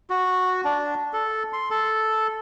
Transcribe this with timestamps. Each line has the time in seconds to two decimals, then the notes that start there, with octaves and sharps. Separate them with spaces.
0.10 F#4
0.64 D4
1.13 A4
1.53 C6
1.71 A4